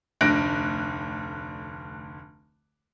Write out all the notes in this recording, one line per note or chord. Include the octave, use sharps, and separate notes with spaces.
F1 D2 D3 F#6 A#6 D7